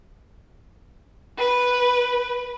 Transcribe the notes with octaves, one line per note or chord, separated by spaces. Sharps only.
B4